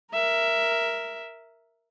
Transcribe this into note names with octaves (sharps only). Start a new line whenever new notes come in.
A#4 E5